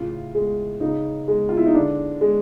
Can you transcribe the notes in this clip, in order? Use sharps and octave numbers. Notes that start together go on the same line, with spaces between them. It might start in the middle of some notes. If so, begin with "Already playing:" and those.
Already playing: A2 C#3 F4
G#3
C#3 D#4
G#3
F4
E4
D#4
D3 D4
G#3